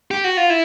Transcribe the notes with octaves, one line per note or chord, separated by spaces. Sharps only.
G4
F#4
F4
E4